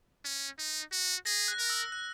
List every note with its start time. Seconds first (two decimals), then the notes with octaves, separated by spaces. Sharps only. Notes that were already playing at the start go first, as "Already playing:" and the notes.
0.25 C#4
0.59 D#4
0.92 F#4
1.26 G#4 A#6
1.48 F#6
1.59 A#4
1.70 E6
1.92 F#6